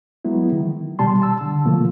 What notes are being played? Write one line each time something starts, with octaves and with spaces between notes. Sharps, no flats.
F#3 G#3 B3 E4
D#3
B2 G3 A5 C6
A5 E6
D3
B2 F3 A3 A#3